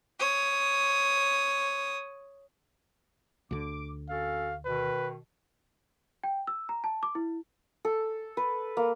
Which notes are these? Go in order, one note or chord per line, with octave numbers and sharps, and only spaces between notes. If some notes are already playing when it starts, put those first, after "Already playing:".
C#5 D#6
D2 D3 D6
C#4 F#4 A4 F5
B2 D#3 B4
G5
E6
A#5
A5
D6
E4
A4
B4
A#3